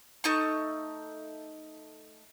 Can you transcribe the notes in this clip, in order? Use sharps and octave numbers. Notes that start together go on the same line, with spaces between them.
A3 D#4 C#6